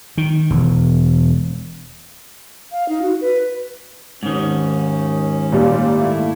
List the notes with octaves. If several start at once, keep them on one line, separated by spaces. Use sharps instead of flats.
D#3
E1
F5
D#4
F#4
B4
D#2 G#2 D#3 C#4
A#2 G3 A#3
A3 E4